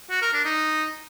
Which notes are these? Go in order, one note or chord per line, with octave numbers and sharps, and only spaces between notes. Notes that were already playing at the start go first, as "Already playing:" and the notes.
F#4
A#4
D4
D#4